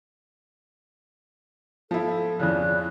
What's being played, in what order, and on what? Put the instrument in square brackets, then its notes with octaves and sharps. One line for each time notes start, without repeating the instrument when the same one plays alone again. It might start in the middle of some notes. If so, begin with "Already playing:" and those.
[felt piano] F3 E4 [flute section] A4
[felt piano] F2 C#3 [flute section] E4 D5 F#6